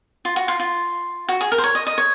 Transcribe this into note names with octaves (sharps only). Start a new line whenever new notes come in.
F4
F#4
F4
F4
F#4
G#4
A#4
C5
C#5
D#5
D#5
C#5